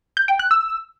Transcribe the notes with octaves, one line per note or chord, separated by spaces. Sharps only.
G6
G5
F#6
E6